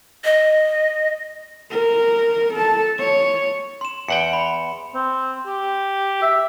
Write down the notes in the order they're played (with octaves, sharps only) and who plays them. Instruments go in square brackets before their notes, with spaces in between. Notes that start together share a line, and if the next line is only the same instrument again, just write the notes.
[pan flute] D#5
[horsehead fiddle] A#4
A4 A5
C#5
[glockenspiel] C6 E7
[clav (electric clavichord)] E2 F#5 G5 [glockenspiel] C#7
[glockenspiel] B5
[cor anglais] C4
G4
E5